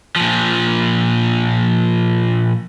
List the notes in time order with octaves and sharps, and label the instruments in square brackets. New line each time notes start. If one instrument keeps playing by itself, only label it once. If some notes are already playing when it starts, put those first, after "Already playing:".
[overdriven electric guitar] A#2 F3